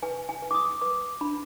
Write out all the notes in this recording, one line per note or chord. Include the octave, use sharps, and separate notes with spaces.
B4 G#5
G#5
B4
D6
D#6
B4 D6
D4 B5